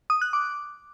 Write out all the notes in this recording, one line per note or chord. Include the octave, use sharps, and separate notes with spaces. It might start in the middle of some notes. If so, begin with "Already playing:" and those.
D#6
F#6
D6